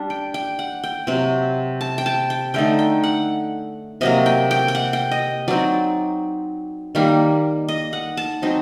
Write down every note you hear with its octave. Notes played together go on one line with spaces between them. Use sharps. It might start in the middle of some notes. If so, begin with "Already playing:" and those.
Already playing: G3 D4
G5
G5
F#5
G5
C3 F#3 C4
A5
G5
A5
G5
D3 A3 D#4 G5
G5
F#5
C3 F#3 A#3 D#5
G5
G5
G5
F#5
G5
D#5
F#3 C4 D#4 D5
D#3 G3 A#3
D#5
F#5
A5
F#3 C4 D#4